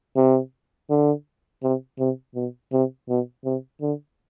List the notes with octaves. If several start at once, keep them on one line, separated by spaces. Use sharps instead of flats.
C3
D3
C3
C3
B2
C3
B2
C3
D3